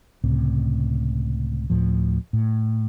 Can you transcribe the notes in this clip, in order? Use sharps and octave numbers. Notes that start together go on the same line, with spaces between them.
C#2 A2 C3
D2 A2 F3
A2